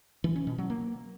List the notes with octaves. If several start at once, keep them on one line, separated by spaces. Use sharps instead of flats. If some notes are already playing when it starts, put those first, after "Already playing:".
E3
C#4
B2
F#3
A#3